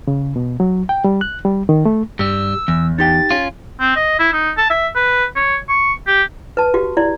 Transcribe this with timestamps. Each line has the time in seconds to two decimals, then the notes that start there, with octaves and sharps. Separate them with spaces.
0.07 C#3
0.36 B2
0.60 F#3
0.89 G5
1.04 G3
1.21 F#6
1.45 G3
1.69 D#3
1.85 A3
2.19 G2 G3 G4 E6
2.68 E2 E3
2.98 D#4 G4 G5 A6
3.31 C#4 F4
3.81 C4
3.96 D#5
4.20 E4
4.33 D#4
4.58 A5
4.70 E5
4.96 B4
5.36 C#5
5.69 C#6
6.07 G4
6.57 B4 A5
6.74 F#4 G4
6.97 E4 D5